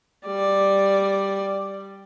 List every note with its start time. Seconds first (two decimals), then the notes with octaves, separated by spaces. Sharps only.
0.27 G3 D5